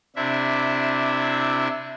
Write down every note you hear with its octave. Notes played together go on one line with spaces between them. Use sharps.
C3 D4 E4 E5